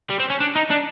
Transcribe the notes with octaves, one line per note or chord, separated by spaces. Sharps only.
G3
C4
C#4
D4
D#4
D4